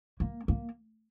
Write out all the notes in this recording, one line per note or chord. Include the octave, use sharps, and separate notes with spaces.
A#3
A#3